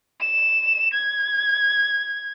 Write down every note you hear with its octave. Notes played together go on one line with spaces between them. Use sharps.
E7
G#6